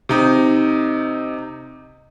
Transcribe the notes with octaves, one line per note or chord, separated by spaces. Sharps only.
C3 D#4